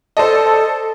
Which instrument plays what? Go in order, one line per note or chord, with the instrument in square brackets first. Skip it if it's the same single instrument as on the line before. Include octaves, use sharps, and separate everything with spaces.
[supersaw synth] A4 [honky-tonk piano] C5 D5 D#5